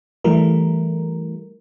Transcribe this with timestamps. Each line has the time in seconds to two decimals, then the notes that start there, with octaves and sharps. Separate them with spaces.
0.24 E3 G3 A3 A#4